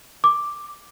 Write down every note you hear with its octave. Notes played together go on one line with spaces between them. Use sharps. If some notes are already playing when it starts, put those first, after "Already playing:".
D6